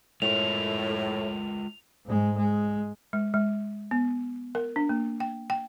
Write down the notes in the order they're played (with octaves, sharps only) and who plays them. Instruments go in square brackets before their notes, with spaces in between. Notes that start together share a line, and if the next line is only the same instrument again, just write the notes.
[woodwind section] A2 [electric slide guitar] G#3 F4 A#4 [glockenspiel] F7
[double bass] G#2 G#3
G#3
[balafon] G#3
G#3
B3
A#4
D4
A#3
G5
G5